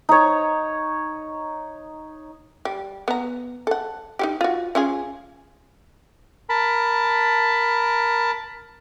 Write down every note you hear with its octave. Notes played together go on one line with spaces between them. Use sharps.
D#4 C#5
G3
B3 A#5
A4 F#5
D#4 F#4 G4
F4 F#4
C#4 F4 G#4
A#4 A5 B5